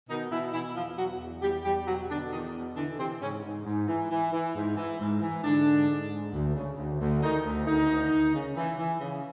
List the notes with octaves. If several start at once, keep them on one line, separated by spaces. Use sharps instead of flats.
B2 D#3 D#4
B2 E3 E4
B2 E3 E4
E2 F3 F4
B2 F#3 F#4
E2
E2 G3 G4
E2 G3 G4
B2 F#3 F#4
B2 D3 D4
E2 D#3 D#4
B2
D3 E3 D4
C3 E3 C4
G#2 C#3 C#4
G#2
G#2
E3
E3
E3
G#2
E3
G#2
E3
G#2 D3 D4
G#2
G#2
G#2
D2
C#3
D2
D2
D#3 E3 D#4
D2
D2 D#3 D#4
D2
D2
C#3
E3
E3
C#3